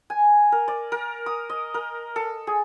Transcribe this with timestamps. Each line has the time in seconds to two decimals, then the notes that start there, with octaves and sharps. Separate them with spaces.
0.10 G#5
0.52 A#4
0.68 D5
0.92 A#4
1.26 D#6
1.50 D#5
1.74 A#4
2.16 A4
2.47 G#4